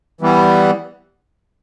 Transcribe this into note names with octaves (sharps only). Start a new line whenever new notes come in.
E3 G3 B3